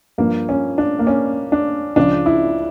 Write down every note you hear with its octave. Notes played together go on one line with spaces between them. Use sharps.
G2 F3 A#3
C#4
D4
A#3
C#4
D4
C#2 C#3 F3 D4
E4